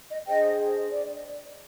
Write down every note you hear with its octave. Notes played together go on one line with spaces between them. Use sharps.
D#5
D4 G#4 C5 D#5 G5
D5